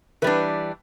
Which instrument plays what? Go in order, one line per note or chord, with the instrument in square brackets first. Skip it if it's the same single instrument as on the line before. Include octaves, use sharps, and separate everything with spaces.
[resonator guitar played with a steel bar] E3 G3 D4 [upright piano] B4